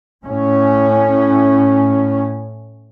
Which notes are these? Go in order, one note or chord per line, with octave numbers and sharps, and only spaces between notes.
A2 C#4